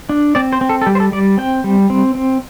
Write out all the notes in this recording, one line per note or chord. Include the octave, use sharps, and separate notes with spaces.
D4
C4 D5
C5
C4
A4
A4
G3 G4
C5
A4
G3 D5
C4 G5
G3
C4
C4